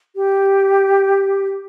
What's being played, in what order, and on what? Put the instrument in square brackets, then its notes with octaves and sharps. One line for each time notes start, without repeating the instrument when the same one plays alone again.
[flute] G4